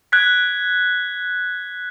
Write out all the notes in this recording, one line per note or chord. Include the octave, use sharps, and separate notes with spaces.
F#6 G#6 B6